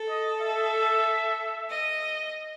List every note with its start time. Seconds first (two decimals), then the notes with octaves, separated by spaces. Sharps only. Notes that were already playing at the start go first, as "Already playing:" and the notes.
Already playing: A4
0.09 D#5
0.41 E5
1.70 D#5